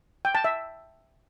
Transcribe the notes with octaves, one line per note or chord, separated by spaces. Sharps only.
G5
A5
E5